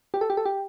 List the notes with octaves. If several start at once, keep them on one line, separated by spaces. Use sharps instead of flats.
G4
A4
G4
A4
G4